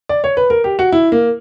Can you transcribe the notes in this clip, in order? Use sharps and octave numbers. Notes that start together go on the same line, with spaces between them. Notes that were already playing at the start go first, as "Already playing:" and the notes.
D5
C#5
B4
A#4
G4
F#4
E4
A#3